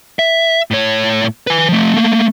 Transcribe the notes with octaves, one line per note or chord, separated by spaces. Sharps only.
E5
A2 C#5
B4 G#5
F3 A3
A3 A#3